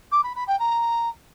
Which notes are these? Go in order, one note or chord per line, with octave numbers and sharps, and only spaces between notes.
D6
B5
B5
G5
A#5